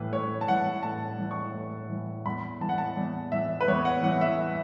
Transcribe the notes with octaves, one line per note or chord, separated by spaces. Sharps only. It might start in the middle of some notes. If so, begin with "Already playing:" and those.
Already playing: A2 E3 B4
A2 C#5
A5
E3 F#5
A2 A5
E3
C#6
A2
E3
E2 B5
E3 A5
F#5
A5
E2
E3 E5
B4
E2 C#5
F#5
E3 F#5
E5